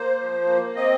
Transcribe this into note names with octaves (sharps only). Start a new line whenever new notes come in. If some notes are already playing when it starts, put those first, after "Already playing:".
Already playing: A#3 C5
F3
A#3
C4 D#5